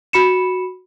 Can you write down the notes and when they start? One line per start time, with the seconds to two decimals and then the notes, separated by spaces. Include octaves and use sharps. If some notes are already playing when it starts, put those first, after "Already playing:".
0.13 F#4 B5 C#7 E7